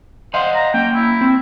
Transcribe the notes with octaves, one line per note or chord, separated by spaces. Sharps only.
C5 D#5 F5 F#5
A#5
A#3 C#4 G5
E4
C4